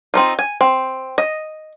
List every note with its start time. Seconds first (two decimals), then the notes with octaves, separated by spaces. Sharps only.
0.14 C4 D#4 F4
0.39 G#5
0.61 C4
1.18 D#5